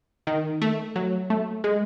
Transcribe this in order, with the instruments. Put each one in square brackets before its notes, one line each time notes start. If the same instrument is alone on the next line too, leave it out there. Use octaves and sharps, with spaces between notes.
[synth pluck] D#3
A3
F#3
A3
G#3